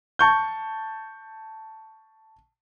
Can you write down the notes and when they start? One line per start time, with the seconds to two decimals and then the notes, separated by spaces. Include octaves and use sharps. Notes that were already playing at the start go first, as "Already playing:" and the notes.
0.19 A5 C#6 G6